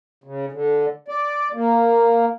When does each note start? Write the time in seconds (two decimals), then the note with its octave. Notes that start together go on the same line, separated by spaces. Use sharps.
0.24 C#3
0.52 D3
1.08 D5
1.54 A#3